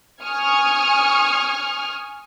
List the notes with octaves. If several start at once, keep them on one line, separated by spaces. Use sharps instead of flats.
G#5 C#6 D#6 F6 G#6